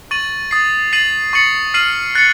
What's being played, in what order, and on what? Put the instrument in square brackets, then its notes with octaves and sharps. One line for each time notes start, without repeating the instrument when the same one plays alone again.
[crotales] C#6 A6 D#7 F#7
D#6 A6 C7
A6 C7 D#7 F#7
C#6 A6 C#7 F#7
F6 C7 D#7 F#7
F#6 A6 C#7